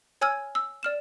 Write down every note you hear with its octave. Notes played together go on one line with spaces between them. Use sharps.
C#5 G#5 E6 F6 G#6
E6
D5 F6 E7